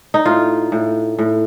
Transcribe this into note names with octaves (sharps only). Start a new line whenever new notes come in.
D#4
A2 F4
A2
A2